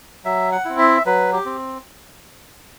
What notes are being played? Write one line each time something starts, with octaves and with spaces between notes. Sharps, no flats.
F#3 E5
F#5
C4 E4
E5
F#3 B4
G4
C4